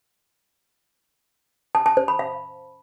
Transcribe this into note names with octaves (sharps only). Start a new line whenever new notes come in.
A5
A5
C5
B5
F5